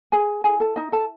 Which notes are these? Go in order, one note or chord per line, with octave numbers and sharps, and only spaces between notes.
G#4 G#5
E4 G#4 A4 G#5
A4 A5
D#4 D#5
A4 A5